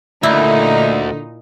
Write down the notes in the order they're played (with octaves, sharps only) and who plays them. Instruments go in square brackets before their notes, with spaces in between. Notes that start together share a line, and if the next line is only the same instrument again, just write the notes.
[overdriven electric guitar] D2 [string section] A#2 D#4 [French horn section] D3 [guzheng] E4